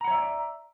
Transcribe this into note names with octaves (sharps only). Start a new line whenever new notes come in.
C#5 D5 E5 F#5 A#5